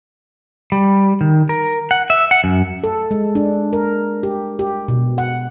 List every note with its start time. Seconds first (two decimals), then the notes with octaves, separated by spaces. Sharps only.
0.72 G3
1.21 D#3
1.49 A#4
1.91 F#5
2.10 E5
2.31 F#5
2.44 F#2
2.84 A4
3.11 G#3
3.35 D4
3.73 A#4
4.23 G4
4.59 G4
4.88 B2
5.18 F#5